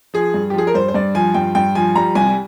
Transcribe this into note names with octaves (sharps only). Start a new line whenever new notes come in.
F3 G#4
G2
G4
F3 G#4
A#4
G2 C5
C5
G2 D5
F3 G#5
G2 G5
G2 G5
F3 G#5
G3 A#5
C2 G#5